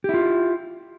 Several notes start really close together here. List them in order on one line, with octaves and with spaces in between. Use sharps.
G4 E4 F4